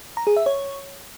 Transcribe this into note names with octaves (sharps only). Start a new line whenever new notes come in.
A#5
G#4
E5
C#5